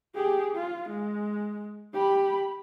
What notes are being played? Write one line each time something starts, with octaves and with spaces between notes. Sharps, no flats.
G4 G#4
F4
G#3
G4 B5